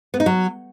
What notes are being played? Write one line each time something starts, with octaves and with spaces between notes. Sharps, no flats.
B3
D#4
F#3